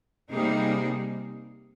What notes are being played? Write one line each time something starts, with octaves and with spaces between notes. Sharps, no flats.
C3 G3 A#3 D#4 G#4